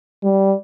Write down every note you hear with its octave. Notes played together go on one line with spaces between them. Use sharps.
G3